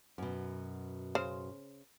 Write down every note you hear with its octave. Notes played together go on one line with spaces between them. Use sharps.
F#2 B2
C#3 C5